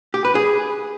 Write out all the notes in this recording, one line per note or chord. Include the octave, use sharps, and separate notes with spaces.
G4
B4
G#4